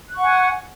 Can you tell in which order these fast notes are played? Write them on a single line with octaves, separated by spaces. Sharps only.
F#6 C#6 F#5 G#5